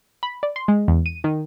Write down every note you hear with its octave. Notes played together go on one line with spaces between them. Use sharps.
B5
D5
C6
G#3
E2
D#7
D#3